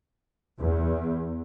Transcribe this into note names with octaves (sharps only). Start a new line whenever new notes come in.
E2